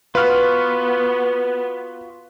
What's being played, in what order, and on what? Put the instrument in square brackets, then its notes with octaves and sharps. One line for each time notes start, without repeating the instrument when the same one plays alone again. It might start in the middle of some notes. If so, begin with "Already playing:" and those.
[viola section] B3 [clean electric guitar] F4 F#4 [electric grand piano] B4 F6